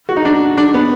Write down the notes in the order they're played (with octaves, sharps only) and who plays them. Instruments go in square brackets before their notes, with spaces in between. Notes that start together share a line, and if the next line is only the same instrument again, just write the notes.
[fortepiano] F#4
D#4
D4
D4
B3